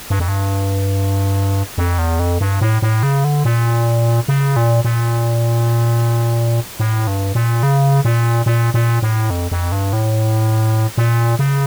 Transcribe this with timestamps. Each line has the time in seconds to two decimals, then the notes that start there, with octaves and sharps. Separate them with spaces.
0.10 G2
0.20 F2
0.28 G2
1.78 F2
1.98 E2
2.19 F2
2.41 G2
2.61 A2
2.82 A2
3.03 C#3
3.24 D3
3.45 A#2
4.28 C#3
4.56 A#2
4.84 A#2
6.80 A2
7.07 G2
7.35 A#2
7.63 C#3
8.05 A#2
8.46 A#2
8.74 A#2
9.02 A2
9.30 F2
9.51 F2
9.72 G2
9.93 A2
10.98 A#2
11.39 C#3